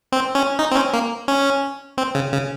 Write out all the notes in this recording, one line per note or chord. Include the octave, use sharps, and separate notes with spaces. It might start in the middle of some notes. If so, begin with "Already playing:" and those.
C4
C#4
D#4
C4
C#4
A#3
C#4
C4
C#3
C#3